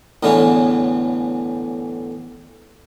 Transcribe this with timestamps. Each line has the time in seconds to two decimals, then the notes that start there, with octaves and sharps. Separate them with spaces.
0.23 E2 A2 D3 E3 C#4